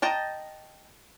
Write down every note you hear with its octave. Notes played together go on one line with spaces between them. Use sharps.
D#5 G5 A5 A#5